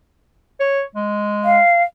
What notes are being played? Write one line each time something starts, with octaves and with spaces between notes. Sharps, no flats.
C#5
G#3
F5